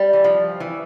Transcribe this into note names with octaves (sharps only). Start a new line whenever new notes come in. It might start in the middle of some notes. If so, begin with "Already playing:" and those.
Already playing: G3
E3
F3
E3